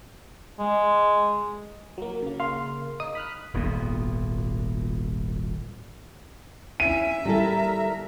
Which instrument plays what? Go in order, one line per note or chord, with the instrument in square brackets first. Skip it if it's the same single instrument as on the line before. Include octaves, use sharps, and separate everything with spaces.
[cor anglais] G#3
[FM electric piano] F#3 A#3
C#3 A#3
[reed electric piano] F5 C6
[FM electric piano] D#4 [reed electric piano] D#6
[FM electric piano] B5 F6 F#6
[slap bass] D#1 G#1 A#2 B3
[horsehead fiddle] C#4 E4 [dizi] E5 [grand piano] D#7
[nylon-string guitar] G3 E4 A4 [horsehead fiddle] A#4 A#5